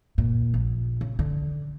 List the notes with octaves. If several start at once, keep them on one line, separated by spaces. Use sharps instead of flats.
A#2
A#1
C#3
D3